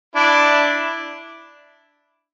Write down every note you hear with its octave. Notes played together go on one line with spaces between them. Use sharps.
D4 E4